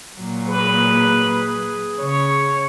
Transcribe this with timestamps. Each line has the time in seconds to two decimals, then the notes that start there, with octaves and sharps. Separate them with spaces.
0.17 A#2 F#3
0.47 G#4 B4
1.99 C#3 C#5